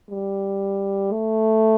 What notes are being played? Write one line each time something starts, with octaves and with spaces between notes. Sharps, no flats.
G3
A3